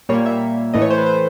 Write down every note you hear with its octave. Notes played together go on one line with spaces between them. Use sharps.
A#2 G3 A#3 C#5
E5
A2 E3 A3 D#5
C#5
C5
B4
C5